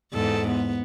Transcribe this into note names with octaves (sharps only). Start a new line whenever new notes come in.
E2 G#2 A4
B3